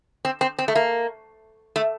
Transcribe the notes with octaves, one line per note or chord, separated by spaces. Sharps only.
C4
C4
C4
A3
A#3
A3